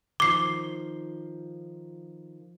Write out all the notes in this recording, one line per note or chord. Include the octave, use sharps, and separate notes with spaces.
D#3 F3 D6 C7